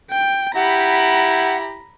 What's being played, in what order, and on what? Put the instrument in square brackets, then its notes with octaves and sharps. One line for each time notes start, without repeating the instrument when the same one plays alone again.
[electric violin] G5
[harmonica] E4 G4 [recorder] F#5 [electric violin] A#5 B5